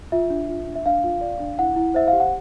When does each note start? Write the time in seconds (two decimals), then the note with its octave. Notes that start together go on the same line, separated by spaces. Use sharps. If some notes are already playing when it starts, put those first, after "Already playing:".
0.12 F4 E5
0.30 D4
0.48 F4
0.67 D4
0.75 E5
0.86 D4 F5
1.04 F4
1.21 D5
1.40 D4
1.59 E4 F#5
1.76 E4
1.94 C5 E5
2.08 F5
2.13 G4
2.20 F#5